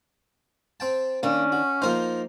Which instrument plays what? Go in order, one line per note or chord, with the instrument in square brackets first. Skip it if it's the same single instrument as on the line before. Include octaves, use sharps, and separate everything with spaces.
[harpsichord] C4 G5 A5
[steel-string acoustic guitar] D#3 D4 [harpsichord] A#3 [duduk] C#4
[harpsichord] F#4
[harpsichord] F3 A#4 C5 [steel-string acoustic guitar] A#3 D#4